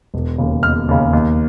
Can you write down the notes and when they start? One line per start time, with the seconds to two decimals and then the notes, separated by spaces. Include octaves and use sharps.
0.14 E1
0.38 D#2 C#3
0.63 E1 F6
0.88 D#2 C#3
1.13 D#2